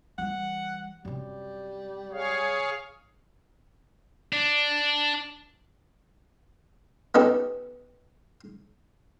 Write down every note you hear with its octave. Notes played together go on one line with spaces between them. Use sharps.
E3 G3 F#5
F#2 C3 G3
G#4 C#5 F5
D4
B3 C#4 D#4 G4 A4 B4